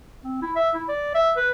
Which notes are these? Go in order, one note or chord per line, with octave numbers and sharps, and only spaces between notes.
C4
E4
E5
E4
D5
E5
B4